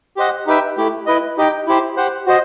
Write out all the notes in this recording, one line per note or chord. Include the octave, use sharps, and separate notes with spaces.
G4 C5 D#5 F#5
D#4 G4 B4 E5 G5
A3 E4 G4
E4 B4 D#5
D#4 G4 D#5 G5
E4 G4 C5
G4 C5 F#5
F#4 C5 D#5